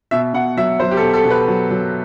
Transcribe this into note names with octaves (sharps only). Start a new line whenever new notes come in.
B2 E5
B2 F#5
F#3 E5
F#3 C5
G4
A4
B2
A4
B2
B4
F#3
F#3